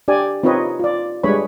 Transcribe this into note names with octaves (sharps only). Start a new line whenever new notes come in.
D4 G4 D5 G#5
C4 D#4 F4 B4 C#5 D#5
F4 D5
G3 G#3 D4 B4 C#5 B5